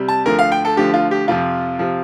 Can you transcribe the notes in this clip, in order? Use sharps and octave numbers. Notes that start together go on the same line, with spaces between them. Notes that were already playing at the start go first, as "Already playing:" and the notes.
Already playing: C3 G3
A5
D2 D3 F3 A#4
F5
G5
A4
D2 D3 F3 G4
F4
G4
F2 C3 F3 F4
C3 F3